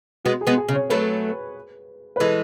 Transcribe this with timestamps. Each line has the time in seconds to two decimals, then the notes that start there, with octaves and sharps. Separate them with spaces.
0.25 G#3 B3 F#4
0.41 G#4
0.47 G#3 B3
0.57 G#4
0.69 C#3
0.74 C#5
0.90 F#3 A3 B4
2.16 B4
2.20 E3 G#3 A4